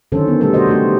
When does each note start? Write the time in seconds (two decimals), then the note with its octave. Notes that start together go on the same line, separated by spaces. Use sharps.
0.12 D3 D#3 F#3 C#4 A4 C5
0.28 B3
0.41 B2 G3 A3 A4
0.54 C3 F#4 C5 D#5
0.67 F#3 A3 C4 F#4 G4